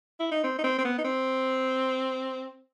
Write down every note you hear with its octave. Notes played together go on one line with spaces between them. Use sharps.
E4
D#4
C4
D#4
C4
C4
B3
D#4
C4